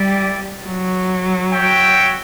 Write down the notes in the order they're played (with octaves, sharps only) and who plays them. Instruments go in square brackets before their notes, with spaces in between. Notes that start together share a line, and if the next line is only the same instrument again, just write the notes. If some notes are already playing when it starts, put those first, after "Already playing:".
Already playing: [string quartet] G3 [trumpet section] E4 G4 D5 G5
[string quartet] F#3
[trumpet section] F#4 C#5 E5 G5